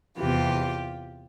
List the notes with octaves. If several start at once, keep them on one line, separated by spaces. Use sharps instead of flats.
E2 C3 E3 F4 G4